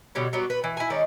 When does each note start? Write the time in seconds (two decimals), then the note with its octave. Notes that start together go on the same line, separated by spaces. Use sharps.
0.15 B2 D3 G3 C#4
0.33 F#3 G3 B3
0.50 B4
0.64 E3
0.77 E4 G#5
0.90 D#3 G#3 C#4 D5